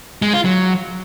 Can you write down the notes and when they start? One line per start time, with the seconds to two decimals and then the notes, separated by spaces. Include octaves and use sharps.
0.22 G#3
0.33 F4
0.45 F#3